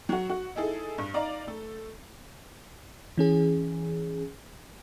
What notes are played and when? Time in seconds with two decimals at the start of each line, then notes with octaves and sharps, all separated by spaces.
0.09 F#3 F#4
0.30 F#4
0.56 D#4 E4 G#4 A4
0.98 G2
1.14 D#4 D5 F5 A#5
1.47 A3 A4
3.18 E3 C#4 G#4